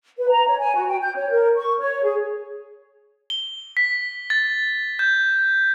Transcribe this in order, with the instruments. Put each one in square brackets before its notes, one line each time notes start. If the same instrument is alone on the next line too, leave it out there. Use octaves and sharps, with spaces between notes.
[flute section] B4
A#5
C#5
G#5
F#4
G5
G6
C#5
A#4
C#6
C#5
G#4
[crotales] G7
B6
A6
G6